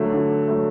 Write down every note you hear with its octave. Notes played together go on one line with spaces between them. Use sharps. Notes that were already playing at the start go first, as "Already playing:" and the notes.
Already playing: D3 F#3 A3
D3
F#3 A3